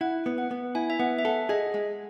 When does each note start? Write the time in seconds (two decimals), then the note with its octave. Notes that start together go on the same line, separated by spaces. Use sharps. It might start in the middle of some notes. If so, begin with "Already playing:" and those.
0.01 E4 F#5
0.26 B3
0.38 F#5
0.51 B3
0.75 E4 G#5
0.90 E5
0.99 B3 F#5
1.19 E5
1.25 A4 F#5
1.49 G#4 D#5
1.74 G#3